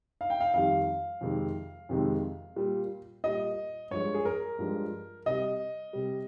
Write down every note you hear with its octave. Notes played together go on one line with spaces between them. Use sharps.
F5
G5
F5
F2 D#3 G3 F5
F2 C3 D#3 G#3
F2 C3 D#3 G#3
A#2 G3
A#2 G3 D#5
G2 F3 G#3 C#5
G#4
A#4
G2 F3 G#3
C3 G3 D#5
C3 G3